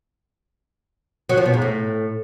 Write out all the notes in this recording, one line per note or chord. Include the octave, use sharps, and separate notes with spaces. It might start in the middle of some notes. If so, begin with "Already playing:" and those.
F#3
F3
B2
G#2
A2